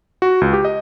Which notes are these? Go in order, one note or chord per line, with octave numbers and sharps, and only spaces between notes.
F#4
C#2
G4
D#5